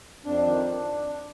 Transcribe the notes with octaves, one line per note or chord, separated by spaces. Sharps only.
F2 D4
D#3